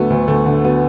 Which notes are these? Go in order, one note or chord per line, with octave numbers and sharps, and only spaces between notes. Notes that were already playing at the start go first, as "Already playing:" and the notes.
Already playing: D2 D3 F#3 A3 B3
D2
D2 A3
D3
F#3 B3